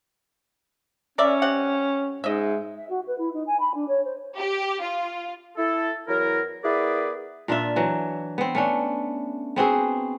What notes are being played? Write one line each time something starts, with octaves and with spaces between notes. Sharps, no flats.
C#4 A#4 D5 E5
C3 G4 F#5
G#2 D#5 E5
E5
F#4
B4
E4
D#4
G#5
B5
D4
C#5
C5
G4
F4
E4 A4
E2 F#3 E4 A#4
B3 E4 G#4 A#4 B4 D5
A#2 D4 F4 E5
E3 F#3
B3 C4
A3 C#4 D4
B3 C4 F#4 G#4